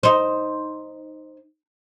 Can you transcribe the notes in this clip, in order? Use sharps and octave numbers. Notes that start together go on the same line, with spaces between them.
D#4 C5